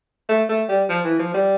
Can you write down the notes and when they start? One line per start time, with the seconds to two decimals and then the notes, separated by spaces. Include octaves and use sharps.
0.29 A3
0.49 A3
0.69 G3
0.89 F3
1.05 E3
1.19 F3
1.34 G3